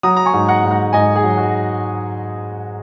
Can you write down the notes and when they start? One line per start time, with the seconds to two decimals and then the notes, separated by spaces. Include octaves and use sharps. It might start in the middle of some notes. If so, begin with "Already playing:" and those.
0.03 F#3 A#5 D#6
0.16 A#5
0.26 G#5 C#6
0.33 G#2
0.49 F#5 A#5
0.64 G#2
0.71 F#5 A#5
0.93 G#2 D#5 G#5
1.16 G#4
1.24 F#3
1.38 F#4